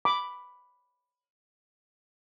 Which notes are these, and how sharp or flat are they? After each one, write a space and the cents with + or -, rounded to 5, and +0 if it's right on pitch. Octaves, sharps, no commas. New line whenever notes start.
B5 +0 D6 +0